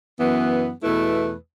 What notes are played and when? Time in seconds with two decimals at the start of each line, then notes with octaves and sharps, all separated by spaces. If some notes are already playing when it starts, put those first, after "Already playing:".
0.19 F#2 E3 B3
0.82 E2 B2 A3 E4 B4